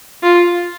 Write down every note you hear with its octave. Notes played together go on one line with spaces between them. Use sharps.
F4